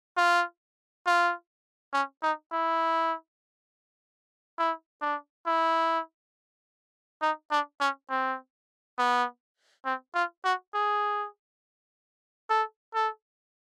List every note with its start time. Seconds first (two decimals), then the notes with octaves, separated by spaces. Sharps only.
0.17 F4
1.06 F4
1.93 C#4
2.23 D#4
2.52 E4
4.58 E4
5.02 D4
5.46 E4
7.22 D#4
7.51 D4
7.80 C#4
8.10 C4
8.98 B3
9.85 C4
10.15 F4
10.45 F#4
10.74 G#4
12.50 A4
12.95 A4